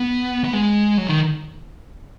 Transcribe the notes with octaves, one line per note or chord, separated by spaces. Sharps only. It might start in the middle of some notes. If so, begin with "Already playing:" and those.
Already playing: B3
B3
G#3
F#3
D#3